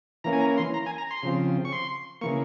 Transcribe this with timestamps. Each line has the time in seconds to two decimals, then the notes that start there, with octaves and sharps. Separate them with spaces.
0.24 E3 A#3 C#4 A#5
0.33 G#5
0.41 A#5
0.58 C6
0.74 A#5
0.86 G#5
0.98 A#5
1.11 C6
1.23 C#3 F3 C4
1.65 C#6
1.73 C6
2.21 C#3 E3 A#3 C#6